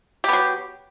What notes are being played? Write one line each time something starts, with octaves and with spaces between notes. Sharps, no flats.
F#3 B3 G4